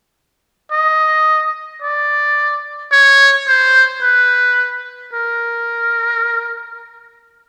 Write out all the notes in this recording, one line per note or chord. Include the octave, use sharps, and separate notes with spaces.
D#5
D5
C#5
C5
B4
A#4